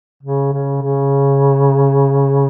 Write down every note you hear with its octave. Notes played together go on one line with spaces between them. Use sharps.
C#3
C#3
C#3